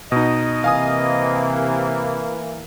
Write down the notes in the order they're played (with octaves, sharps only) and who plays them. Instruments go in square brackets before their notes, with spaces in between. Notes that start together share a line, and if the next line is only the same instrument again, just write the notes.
[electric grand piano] B2 D#4 [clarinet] D#5
[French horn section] C3 [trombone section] E3 A#3 [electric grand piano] F5 G#5 D#6